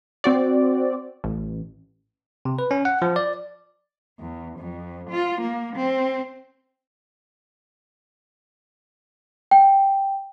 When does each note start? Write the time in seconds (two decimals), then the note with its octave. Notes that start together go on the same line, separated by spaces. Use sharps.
0.24 C4 F#4 D5
1.24 A1
2.45 C3
2.59 B4
2.71 C#4
2.85 F#5
3.02 F3
3.16 D5
4.20 E2
4.58 F2
5.10 F4
5.41 A#3
5.76 C4
9.51 G5